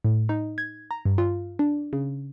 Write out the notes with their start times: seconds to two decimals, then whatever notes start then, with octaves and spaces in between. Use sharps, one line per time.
0.04 A2
0.29 D#4
0.58 G#6
0.91 A#5
1.05 G2
1.18 F4
1.59 D4
1.93 C#3